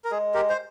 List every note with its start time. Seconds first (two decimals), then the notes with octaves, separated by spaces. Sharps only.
0.04 A#4
0.11 G#3 G#4
0.34 G4 A#4
0.50 C5